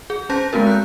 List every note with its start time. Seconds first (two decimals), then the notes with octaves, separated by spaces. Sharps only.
0.10 G#4
0.30 C#4 C5 A5 G6 A#6
0.53 G#3 B3 C4 F#4 A#4
0.67 F#6 G6